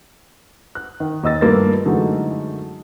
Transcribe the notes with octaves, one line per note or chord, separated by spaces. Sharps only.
F#6
D#3
D#2 D#5 E6 A6
G2 A3 A#3 F4 B4 A6
F#2 D3 E3 G#3 A3 D#4